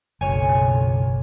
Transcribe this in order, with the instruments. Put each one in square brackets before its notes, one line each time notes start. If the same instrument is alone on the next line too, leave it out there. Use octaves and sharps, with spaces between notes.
[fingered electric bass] F#1 [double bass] B1 [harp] C#5 G#5